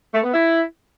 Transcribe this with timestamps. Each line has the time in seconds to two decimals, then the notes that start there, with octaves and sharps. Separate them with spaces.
0.13 A3
0.23 B3
0.33 E4